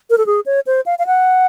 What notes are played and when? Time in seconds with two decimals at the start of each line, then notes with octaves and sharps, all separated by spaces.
0.10 A#4
0.18 A4
0.26 G#4
0.46 C#5
0.67 C5
0.86 F5
0.99 F5
1.06 F#5